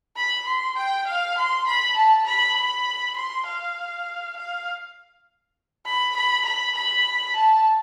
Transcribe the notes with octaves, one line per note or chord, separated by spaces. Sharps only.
B5
C6
G5
F5
C6
B5
A5
B5
B5
C6
F5
F5
B5
B5
B5
B5
A5